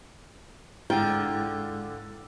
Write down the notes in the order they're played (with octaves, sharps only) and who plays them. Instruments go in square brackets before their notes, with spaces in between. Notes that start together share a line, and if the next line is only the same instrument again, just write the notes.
[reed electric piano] G#2 G#3 [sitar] D3 F4 [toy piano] E4 [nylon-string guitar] G5